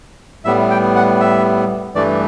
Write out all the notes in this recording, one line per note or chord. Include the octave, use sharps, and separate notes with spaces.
A2 G3 B3 E5
G5
F#5
E5
G2 E3 A3 D5